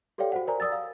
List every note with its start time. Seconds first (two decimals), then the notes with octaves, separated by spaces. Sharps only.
0.18 G4 A4 C#5 D5 F5 G5
0.32 F#4 C5 F#5
0.47 A#4 C5 D5 G#5 A#5
0.60 D5 D#6 E6 A6
0.72 F5